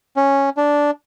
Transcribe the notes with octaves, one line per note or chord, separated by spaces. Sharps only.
C#4
D4